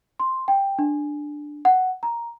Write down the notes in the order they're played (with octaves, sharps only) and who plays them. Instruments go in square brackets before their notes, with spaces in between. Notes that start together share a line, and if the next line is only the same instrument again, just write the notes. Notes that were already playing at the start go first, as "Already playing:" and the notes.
[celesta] C6
G5
D4
F#5
A#5